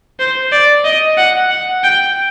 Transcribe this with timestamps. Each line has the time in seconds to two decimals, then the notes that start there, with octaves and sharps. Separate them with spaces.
0.19 C5
0.52 D5
0.85 D#5
1.17 F#5
1.51 F#5
1.83 G5